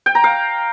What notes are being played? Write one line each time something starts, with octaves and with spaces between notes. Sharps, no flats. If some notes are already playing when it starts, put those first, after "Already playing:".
G5
A#5
F5